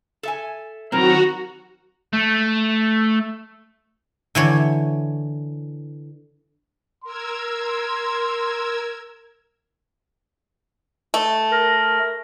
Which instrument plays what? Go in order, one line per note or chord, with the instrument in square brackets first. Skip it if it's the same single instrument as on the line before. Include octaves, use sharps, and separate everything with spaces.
[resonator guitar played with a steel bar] A4 E5 G#5
[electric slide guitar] D#3 F#3 C4 [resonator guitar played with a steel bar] E4 A#4 [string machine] F#4 [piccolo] A#5
[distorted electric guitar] A3
[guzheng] D3 E3 C#5
[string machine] A#4 E6 G#6 [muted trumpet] C6
[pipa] A3
[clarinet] A#4